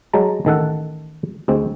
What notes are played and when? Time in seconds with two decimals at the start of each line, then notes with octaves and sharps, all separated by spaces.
0.13 F#3 G#3 A5 A#5
0.45 A1 D#3 A4 F#5
1.48 D2 G#3 C4